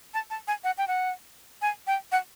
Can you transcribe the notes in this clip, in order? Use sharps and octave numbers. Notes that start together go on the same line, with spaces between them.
A5
A5
G#5
F#5
G5
F#5
G#5
G5
F#5